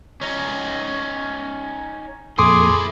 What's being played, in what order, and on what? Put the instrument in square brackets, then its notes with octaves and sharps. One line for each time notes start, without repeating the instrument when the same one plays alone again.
[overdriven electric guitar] C#4 D#4
[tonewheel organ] F2 A#2 A4 [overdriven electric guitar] E4 G#4 [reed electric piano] C6 D6 D#6